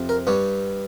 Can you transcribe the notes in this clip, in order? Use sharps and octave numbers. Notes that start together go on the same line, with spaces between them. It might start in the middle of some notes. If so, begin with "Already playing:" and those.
Already playing: F2 C3
A#4
G2 G3 C#5